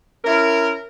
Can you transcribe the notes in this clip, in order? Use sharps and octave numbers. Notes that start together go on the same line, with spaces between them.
C#4 E4 A#4